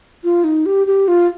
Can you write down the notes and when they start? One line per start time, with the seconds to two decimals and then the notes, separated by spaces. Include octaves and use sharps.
0.24 F4
0.44 D#4
0.66 G4
0.87 G4
1.08 F4